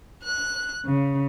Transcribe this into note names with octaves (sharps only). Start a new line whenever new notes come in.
F#6
C#3